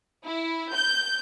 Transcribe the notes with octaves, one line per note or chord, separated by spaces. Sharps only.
E4
G6